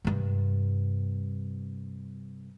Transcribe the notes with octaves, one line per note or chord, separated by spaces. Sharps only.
G2 C3